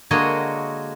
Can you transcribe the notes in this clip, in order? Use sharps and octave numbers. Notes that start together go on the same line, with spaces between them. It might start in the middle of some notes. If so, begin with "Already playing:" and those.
D3 G#3 A#3 F#4 C#5 D#5